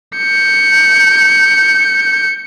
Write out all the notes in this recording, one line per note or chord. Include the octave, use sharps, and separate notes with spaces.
G6 C#7